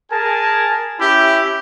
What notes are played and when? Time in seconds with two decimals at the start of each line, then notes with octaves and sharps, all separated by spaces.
0.11 G#4 A#4 G#5 A5
1.00 C#4 E4 G4 E5